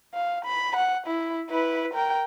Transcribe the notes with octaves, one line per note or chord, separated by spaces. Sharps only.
F5
B5
F#5
E4
E4 B4
A#4 G5